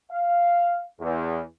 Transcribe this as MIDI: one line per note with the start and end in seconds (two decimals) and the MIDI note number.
0.12 0.82 77
0.99 1.40 40